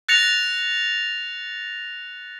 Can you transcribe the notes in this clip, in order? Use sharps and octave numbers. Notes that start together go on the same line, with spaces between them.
F#6 A6 A#6 C#7 F7